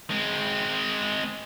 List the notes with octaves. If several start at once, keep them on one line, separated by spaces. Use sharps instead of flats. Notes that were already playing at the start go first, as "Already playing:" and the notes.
G#3 C4